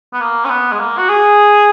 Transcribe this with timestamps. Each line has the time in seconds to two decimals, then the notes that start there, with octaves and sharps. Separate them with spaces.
0.13 B3
0.21 A#3
0.45 C#4
0.50 B3
0.72 G#3
0.80 A#3
0.98 F#4
1.09 G#4